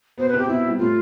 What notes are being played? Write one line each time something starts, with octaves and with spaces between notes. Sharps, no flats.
B2 B3 C5
B4
C3 C4 G4
B2 B3 E4
G3
A2 A3 F4